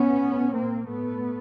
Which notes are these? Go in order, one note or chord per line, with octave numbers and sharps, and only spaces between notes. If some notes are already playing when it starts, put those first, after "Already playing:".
Already playing: B3 C#4
A2
A#2 A#3 C4
A2 A3 B3